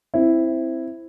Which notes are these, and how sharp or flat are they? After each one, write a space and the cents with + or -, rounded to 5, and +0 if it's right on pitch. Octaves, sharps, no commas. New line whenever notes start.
C4 +0 E4 +0